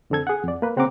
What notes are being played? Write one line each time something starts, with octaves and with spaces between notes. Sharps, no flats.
F2 D3 C4 A4 G#6
G#4 F#5
F2 D5
A#3 B4
C#3 C4 F#5 A#5 D6